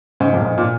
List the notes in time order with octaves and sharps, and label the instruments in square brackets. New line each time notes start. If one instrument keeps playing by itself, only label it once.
[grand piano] G#2 C#3
F2 A#2
G#2
A#2